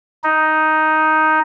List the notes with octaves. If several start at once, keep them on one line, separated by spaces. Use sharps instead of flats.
D#4